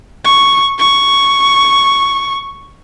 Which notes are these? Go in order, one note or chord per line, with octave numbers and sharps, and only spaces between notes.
C#6
C#6